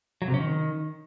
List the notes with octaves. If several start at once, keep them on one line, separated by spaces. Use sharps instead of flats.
F#3
C3
C#4
D#3